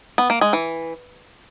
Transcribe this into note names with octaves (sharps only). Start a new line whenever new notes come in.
B3
A#3
G#3
E3